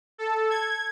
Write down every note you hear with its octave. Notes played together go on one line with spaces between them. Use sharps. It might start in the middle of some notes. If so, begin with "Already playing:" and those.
A4
G#6